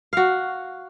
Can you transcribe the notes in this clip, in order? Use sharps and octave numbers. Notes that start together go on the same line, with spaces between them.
F#4 F5